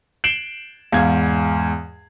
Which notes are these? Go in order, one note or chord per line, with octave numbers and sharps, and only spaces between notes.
C7 D7 E7 F#7 G7
E2 G#2 F5 G#6